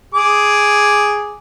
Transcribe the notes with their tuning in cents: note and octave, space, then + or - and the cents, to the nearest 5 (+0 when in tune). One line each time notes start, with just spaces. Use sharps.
G#4 +0 D6 +0